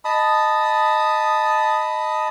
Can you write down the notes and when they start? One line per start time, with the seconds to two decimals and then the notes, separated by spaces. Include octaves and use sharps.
0.05 D#5 A5 B5 D#6